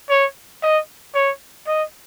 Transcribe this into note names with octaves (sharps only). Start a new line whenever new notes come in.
C#5
D#5
C#5
D#5